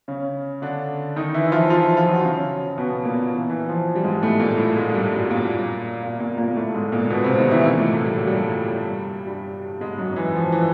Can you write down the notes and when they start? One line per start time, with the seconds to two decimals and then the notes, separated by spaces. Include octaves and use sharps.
0.08 C#3 C#4
0.62 D3 D4
1.16 D#3 D#4
1.34 E3 E4
1.46 E4
1.52 F3 F4
1.70 F3 F4
1.83 F3 F4
1.97 F3 F4
2.11 F#3 F#4
2.24 C#3 C#4
2.78 B2 B3
3.05 A#2 A#3
3.33 E3
3.50 E3
3.69 F3
3.96 G3
4.04 G#2 G#3
4.23 A2 A3
4.40 A#2 A#3
4.58 A2 A3
4.76 G#2 G#3
4.94 G2 G3
5.12 F#2 F#3
5.31 A#2 A#3
6.03 A#2 A#3
6.20 A#2 A#3
6.38 A#2 A#3
6.48 A#3
6.56 A2 A3
6.74 G#2 G#3
6.92 A#2 A#3
7.10 B2 B3
7.24 C3 C4
7.37 D#3 D#4
7.51 E3 E4
7.65 A#2 A#3
7.78 A2 A3
8.05 G3
8.16 F#3
8.27 G2 G3
9.27 G2 G3
9.80 G#2 G#3
9.98 F#2 F#3
10.16 E3
10.35 F3
10.52 E3